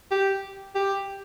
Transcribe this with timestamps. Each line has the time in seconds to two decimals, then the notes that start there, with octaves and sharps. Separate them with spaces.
0.11 G4
0.75 G4